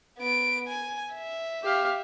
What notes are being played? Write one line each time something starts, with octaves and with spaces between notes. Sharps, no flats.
B3 D7
G#5
E5
G4 F5